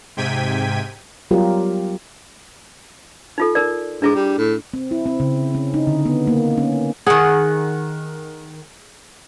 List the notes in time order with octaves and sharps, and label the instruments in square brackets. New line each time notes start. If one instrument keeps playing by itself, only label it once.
[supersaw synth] G#2 C3 G5 G#6 B6 D#7
[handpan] F#3 G3 B3 F4 G4 A#4
[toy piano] D#4 F4 A4
D#4 A#4 D5
[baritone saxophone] G#2 [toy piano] D4 E4 G#4
[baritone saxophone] G3
A2
[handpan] C4
E4
C4
C#3
C#4
D#4
D3
B3
A#3
C#4
[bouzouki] D#3 F#5 [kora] G#4